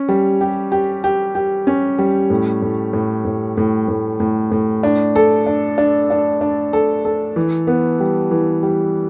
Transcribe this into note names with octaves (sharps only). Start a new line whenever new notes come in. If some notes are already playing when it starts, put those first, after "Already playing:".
Already playing: C#4
G3
G4
G4
G4
G4
C#4
G3
A2
A2
A2
A2
A2
A2
A2
A2
D4
A4
D4
D4
D4
D4
A4
A4
E3
B3
G3
E3
G3